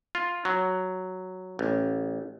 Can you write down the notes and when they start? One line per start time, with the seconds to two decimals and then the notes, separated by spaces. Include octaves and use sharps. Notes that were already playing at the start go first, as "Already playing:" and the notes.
0.15 F4
0.45 F#3
1.59 A1